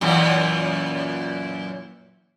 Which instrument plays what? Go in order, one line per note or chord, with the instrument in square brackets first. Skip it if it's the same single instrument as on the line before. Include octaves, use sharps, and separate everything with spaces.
[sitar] F#2 A#2 E3